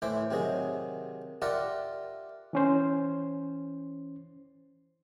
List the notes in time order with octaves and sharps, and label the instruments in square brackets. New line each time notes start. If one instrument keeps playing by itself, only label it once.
[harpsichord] A2 E3 C5 E5 D6
C3 D#3 F#3 G#4
F4 G4 A#4 D5 E5 F#5
[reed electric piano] E3 C#4 C5